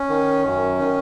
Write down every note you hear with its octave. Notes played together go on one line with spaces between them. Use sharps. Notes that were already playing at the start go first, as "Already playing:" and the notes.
Already playing: C#4
D#3
F#2
D#3